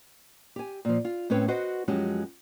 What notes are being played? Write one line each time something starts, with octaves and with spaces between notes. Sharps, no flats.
G4 G#5
A#2 F3
F4
A2 C4 C#4 B4 C#5
F#4 B4 C5 D#5 F#5
F#2 F3 G#3 C#4 F#4 G4